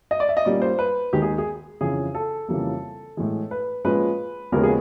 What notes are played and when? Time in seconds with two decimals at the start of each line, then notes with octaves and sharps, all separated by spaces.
0.11 D#5
0.20 D5
0.29 E5
0.37 D#5
0.45 A#2 G3 A#3 C#4 D5
0.62 C5
0.79 B4
1.13 D#2 D#3 G#3 G4
1.22 G#4
1.38 G#4
1.81 F2 C#3 E3 G#4
2.15 A4
2.48 F2 C#3 E3 G3 A#3
3.17 A2 E3 G#3
3.51 B4
3.85 A#2 F3 G#3 C#4 B4
4.52 D#2 C#3 F3 G#3 B3 A#4
4.64 G#4